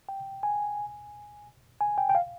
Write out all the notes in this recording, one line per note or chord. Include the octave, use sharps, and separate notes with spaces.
G5
G#5
G#5
G5
G5
F5